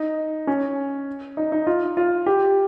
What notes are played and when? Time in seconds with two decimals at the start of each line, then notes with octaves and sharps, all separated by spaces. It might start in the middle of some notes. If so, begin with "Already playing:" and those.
Already playing: D#4
0.47 C#4
1.37 D#4
1.52 D#4
1.67 F4
1.97 F4
2.26 G4